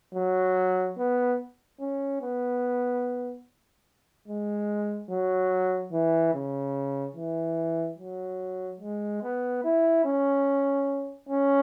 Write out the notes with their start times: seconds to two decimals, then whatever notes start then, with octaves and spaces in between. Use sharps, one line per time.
0.15 F#3
0.98 B3
1.80 C#4
2.22 B3
4.28 G#3
5.10 F#3
5.93 E3
6.34 C#3
7.16 E3
7.98 F#3
8.81 G#3
9.23 B3
9.64 E4
10.05 C#4
11.29 C#4